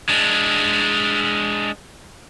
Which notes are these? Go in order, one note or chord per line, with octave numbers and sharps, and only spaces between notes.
G#3 D4